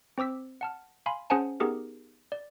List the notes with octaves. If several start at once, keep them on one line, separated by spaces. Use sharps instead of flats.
C4 C5 D6 E6 B6
F#5 A5 F6
F5 G#5 B5 C6
C#4 G#4 C5 F#5 G#5 A5
B3 D#4 G4 G#4 A#4
D5